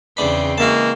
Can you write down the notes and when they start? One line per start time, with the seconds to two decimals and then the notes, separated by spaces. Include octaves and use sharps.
0.17 E2 C#3 C4 D4 B5
0.58 E3 G#3 A#3 F#4 E5 A5